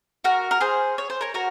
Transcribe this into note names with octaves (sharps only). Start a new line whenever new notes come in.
F#4 A#4
A#4
G#4 C5
C#5
C5
A#4 C#5
F#4 A#4